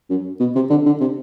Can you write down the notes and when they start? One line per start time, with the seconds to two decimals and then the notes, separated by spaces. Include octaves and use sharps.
0.10 F#2
0.40 B2
0.55 C3
0.70 D3
0.86 D3
1.01 C3